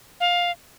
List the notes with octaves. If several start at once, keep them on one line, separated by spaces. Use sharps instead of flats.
F5